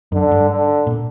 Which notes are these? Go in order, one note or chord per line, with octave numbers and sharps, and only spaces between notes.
F#2 D3
G2
D3
A#2